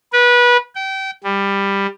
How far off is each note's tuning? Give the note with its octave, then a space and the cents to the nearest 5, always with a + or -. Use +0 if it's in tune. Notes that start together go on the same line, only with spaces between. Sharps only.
B4 -25
G5 -25
G3 +15